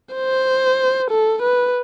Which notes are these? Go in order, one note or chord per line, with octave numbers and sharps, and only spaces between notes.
C5
A4
B4